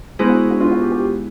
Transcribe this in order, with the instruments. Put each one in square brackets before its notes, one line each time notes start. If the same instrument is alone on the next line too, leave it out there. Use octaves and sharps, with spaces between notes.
[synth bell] G#3 B3 E4 G#4 [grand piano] C5
[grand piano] F#4
F#4
F4
F#4
G4
G4